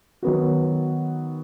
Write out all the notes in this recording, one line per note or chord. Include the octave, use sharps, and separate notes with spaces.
D#3 F#3 B3 F#4